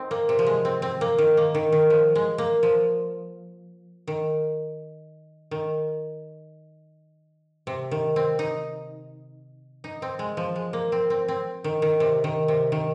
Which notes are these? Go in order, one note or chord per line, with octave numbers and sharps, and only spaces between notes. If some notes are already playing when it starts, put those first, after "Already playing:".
Already playing: C4 D#4
A#3
C3
F3
G#3
C4
C4
A#3
D#3
A#3
D#3
D#3
F3
G#3
A#3
F3
D#3
D#3
C3
D#3
C4
D#4
D#4
C4
G#3
F3
G#3
A#3
C4
C4
C4
D#3
D#3
C3
D#3
C3
D#3